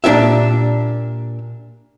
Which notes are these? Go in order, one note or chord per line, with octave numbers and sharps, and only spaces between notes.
A#2 D4 F#4 G4 E5